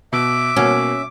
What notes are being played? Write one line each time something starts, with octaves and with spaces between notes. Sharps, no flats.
B2 E5 D6
B2 A#3 C#4 F#4